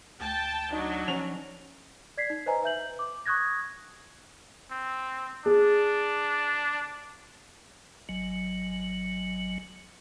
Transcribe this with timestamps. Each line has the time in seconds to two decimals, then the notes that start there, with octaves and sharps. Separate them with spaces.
0.21 D2 G5 A5
0.72 F#3 D4 D#4
1.08 F3 C#4 F7
2.17 D5 G#6 B6 C7
2.30 D#4
2.46 B4 C5 D#5 G#5 A#5
2.63 B4 E5 G6 F#7
2.99 D6
3.26 C#6 D#6 F#6 G#6 A#6
4.72 C4
5.46 D4 G#4
8.09 G#1 F#3